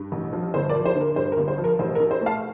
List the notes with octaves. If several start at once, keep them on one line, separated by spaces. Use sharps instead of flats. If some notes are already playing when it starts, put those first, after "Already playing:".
Already playing: G2
A1
F3
G1 C5
A#4 D5
F3
C5
D3
A#4
G2 C5
A#4
G1
C5
F3
A#4
A1 C5
A#4
D4
C5
A3
F5 A5